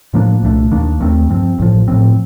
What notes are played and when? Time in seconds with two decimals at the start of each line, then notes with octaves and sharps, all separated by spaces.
0.13 A2 F3 A#3 D4
0.42 C2 A#2 A3 D4
0.71 D#2 D#3 A#3 D4
1.00 D#2 D#3 A3 C4
1.29 G2 F3 C4
1.58 A1 A2 F3
1.88 A2 F3 C4